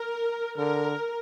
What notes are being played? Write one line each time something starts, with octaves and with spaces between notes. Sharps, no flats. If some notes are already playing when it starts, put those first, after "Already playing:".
Already playing: A#4
D3 A#4